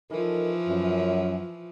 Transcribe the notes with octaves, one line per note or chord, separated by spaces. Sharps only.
E3 F3 D#4 A4 A#4
F#2